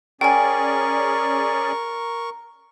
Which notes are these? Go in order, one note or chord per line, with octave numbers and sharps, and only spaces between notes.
C#4 G#4 A#4 D5 G5 G#5 C#6